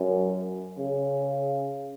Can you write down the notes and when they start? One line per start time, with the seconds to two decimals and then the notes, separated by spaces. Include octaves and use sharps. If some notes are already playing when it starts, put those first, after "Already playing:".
Already playing: F#2
0.78 C#3